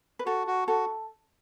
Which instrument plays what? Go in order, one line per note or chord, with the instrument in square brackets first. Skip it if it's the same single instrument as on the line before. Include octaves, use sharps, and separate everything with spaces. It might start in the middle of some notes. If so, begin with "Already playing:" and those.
[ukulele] B4
[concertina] F#4 [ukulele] A4
[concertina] F#4
[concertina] F#4 [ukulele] A4